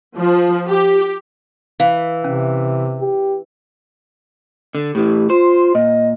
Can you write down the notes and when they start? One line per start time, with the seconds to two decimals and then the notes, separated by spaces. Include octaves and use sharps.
0.18 F3
0.67 G4
1.80 E3 F5
2.24 C3 C#4
3.00 G4
4.75 D3
4.95 A2 E3 G4
5.30 F4 C5
5.75 A#2 D#5